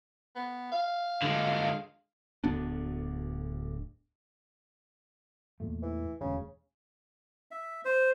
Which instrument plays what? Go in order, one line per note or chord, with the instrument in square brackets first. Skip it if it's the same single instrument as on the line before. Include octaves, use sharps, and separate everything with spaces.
[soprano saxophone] B3
F5
[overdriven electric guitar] D3 G#3
[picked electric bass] D1 D2 B3 D4
[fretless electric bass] E2 A#2 A3
[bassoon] E3
[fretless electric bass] E1 D2 [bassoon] C#3
[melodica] E5
C5